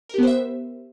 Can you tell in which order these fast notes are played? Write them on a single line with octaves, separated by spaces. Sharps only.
A#4 G4 B3 C5 E5